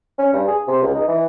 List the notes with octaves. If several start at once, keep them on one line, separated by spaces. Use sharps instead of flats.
C#4
G2
G#4
C3
C#2
D#4
E3